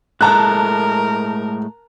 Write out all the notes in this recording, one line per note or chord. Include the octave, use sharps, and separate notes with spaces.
A2 G#3 A3 A#4 A5 A#5 F#6